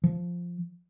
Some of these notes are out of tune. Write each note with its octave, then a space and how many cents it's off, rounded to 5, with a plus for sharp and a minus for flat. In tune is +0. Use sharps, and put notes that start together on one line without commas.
F3 +0